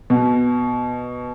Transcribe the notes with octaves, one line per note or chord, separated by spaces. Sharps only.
B2